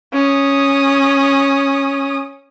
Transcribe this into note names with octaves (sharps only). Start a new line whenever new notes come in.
C#4 D#6